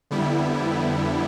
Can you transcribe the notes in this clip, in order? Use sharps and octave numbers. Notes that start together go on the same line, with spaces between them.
F2 D3 G3 B3 E4